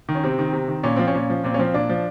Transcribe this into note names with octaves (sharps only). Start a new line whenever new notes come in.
D#3
C#4
C3 C4
D#3
C3
D#3
A#2 C#4
F3 C4
C#4
A#2
F3
A#2 C4
C#4
F3 C4
A#2 D4
F3